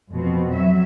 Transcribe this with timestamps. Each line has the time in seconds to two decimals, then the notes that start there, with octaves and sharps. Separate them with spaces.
0.12 F2 B2 C4
0.51 F#3 E5